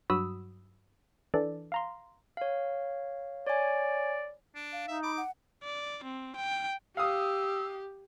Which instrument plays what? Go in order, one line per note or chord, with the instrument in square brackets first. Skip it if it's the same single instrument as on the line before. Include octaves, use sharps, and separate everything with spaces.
[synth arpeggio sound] G2 F#3 F#4 B5 D#6 E6
E3 D4 A4 D5
F5 A#5 C6
[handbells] C#5 F5
[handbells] C#5 G#5 [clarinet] D5
[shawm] D4
[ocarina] F5
[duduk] D#4 [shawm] E5
[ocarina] B5 [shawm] D6
[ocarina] F#5
[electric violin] D5
C4
G5
[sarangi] G4 [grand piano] F5 D#6 [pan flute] E6